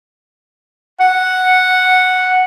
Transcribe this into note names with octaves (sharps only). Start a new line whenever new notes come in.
F#5